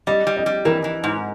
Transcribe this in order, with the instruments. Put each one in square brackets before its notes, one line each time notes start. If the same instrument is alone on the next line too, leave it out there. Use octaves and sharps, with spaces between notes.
[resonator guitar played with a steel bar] G3 [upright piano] D#5
[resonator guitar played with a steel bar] G3
[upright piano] D#5
[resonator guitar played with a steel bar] G3
[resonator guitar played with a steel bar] E3 [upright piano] A#4
[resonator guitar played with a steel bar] E3
G#2